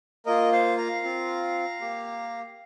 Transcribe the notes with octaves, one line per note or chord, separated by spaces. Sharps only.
A#3 F4 A#4 D#5
C5 F5
F5 A#5
C4 F4
A#3 G4